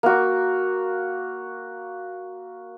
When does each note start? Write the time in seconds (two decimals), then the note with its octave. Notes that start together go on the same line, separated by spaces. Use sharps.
0.03 A#3 F#4